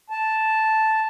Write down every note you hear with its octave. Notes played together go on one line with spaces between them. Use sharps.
A5